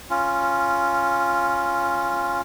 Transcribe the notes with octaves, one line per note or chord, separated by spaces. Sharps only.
C#4 F4